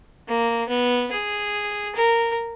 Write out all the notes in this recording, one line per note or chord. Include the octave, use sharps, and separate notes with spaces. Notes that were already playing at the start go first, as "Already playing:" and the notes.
A#3
B3
G#4
A#4